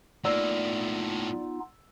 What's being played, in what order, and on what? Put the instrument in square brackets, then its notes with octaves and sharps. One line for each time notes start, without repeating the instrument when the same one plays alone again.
[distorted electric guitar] A2 A#3 [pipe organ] B3 D#4 F4 [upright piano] D5 E6